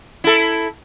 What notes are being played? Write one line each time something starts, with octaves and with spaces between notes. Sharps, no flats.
E4 A4